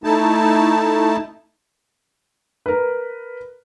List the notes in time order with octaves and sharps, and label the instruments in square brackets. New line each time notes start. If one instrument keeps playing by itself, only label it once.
[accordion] A3 D#4 E4 A5
[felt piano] A#4 B4